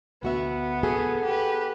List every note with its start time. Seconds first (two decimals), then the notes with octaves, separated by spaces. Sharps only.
0.23 D2 B3 F#4 E5
0.83 F#4 G#4 A4
1.24 G4 B4